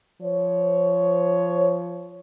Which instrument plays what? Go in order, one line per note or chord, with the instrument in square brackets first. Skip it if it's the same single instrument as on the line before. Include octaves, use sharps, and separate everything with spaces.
[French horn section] F3 C5 C#5